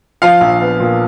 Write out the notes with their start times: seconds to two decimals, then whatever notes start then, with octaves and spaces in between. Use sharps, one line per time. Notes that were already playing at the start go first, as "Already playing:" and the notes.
0.22 F3 F5
0.41 A#1
0.61 B3
0.80 A#2